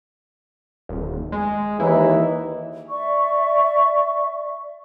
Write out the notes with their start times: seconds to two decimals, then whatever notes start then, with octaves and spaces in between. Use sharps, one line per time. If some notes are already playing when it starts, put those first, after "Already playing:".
0.89 D#1
1.32 G#3
1.80 D#2 E3 D#4 E4
2.88 D5 E5 C#6